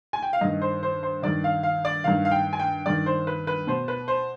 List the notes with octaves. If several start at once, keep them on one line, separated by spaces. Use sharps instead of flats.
G#5
G5
F5
G2 D#3 D#5
C5
C5
C5
G2 D#3 D5
F5
F5
D5
G2 D#3 F5
F5
G5
G#5
G5
G2 D#3 D5
C5
B4
B4
B2 C5
B4
C5